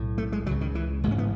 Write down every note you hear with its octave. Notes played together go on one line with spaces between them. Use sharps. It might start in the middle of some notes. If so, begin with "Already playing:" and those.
Already playing: B1 A2
A3
G#3
C#2 C#3 F#3
D#3
E3
A1 G#2 G#3 C#4
B3